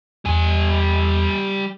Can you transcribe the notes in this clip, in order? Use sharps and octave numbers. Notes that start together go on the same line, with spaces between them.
E2 G3 G#5